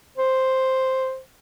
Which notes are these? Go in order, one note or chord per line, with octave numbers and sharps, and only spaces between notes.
C5